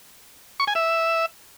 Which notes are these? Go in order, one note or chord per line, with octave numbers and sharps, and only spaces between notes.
C#6
G#5
E5